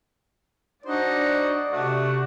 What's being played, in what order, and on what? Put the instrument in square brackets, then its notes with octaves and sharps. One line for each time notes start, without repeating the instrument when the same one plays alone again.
[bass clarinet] D4 [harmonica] D#4 F#4 C5 [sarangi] D5
[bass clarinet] C3 [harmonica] A3 D4 F#4